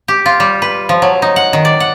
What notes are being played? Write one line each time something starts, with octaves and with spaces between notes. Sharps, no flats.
G4
F4
G3
B4
F3
F#3
D#4
F#5
D#3
D5
F#5